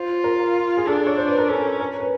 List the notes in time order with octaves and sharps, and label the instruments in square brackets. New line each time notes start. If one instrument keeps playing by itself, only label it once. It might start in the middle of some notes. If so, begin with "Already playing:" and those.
Already playing: [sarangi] F4 [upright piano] C5
[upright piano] A#4
G#4
[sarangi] D4 [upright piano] A4
[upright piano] C#5
C5
B4
A#4
[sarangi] C#4 [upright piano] A4
[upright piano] A#4
B4